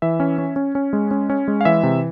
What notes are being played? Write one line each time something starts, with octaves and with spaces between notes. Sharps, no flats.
E3 E5
C#4
C#4
C#4
C#4
G#3
C#4
C#4
G#3
F5
E3 E5
C3